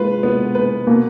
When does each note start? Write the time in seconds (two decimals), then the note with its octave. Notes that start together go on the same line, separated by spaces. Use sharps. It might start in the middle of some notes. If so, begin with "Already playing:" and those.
Already playing: G#3 F4 B4
0.23 B3
0.55 B4
0.87 B2 A#3